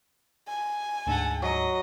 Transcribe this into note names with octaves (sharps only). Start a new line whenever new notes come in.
G#5
D2 G#2 A4 F#5
F#3 D#5